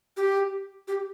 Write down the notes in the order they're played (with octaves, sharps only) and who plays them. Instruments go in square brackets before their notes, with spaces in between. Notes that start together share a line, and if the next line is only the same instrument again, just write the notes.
[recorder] G4
G4